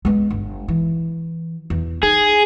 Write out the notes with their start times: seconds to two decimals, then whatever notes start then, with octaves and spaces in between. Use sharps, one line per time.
0.05 G#3 B3
0.30 G1
0.68 E3
1.70 E2
2.03 D#4 G#4